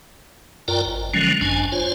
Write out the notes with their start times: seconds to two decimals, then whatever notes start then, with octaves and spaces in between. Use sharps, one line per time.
0.68 F#2 F4 A#4 D5 G5 A#5
0.85 G#1
1.14 D3 F3 F#3 G#3 C#4
1.41 G#1 F#2 D4 G#5
1.72 F4 C5 C#5